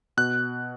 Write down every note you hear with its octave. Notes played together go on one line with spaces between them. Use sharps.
B2 F#6